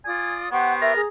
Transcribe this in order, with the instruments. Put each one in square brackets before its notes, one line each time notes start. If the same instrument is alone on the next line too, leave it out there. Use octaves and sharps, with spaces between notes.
[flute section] F4 D5 D#6 [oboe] G#5
[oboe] B3 [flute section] G4 C5 C#6 [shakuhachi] F#5
[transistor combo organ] A#4 [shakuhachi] E5
[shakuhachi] G#4 [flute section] A#5